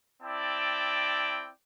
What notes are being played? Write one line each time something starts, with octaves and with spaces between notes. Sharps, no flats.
C4 E4 D5 G5 A5